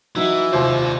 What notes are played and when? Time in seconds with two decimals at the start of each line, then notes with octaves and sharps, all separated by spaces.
0.16 E3 F#3 D#4 F#4 E5
0.53 F1 D#2 F4 C5 D5